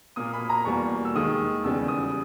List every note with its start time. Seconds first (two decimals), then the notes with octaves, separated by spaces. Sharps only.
0.16 A#2 A#3 D#6
0.33 B5
0.50 A#5
0.65 E2 B2 G3 A#3 C#6
1.05 E6
1.15 D#2 D#3 G#3 D#6
1.64 E2 C#3 G3 E6
1.88 D#6